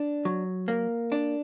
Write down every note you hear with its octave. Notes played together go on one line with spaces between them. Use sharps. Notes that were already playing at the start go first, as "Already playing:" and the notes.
Already playing: D4
F#3
A#3
D4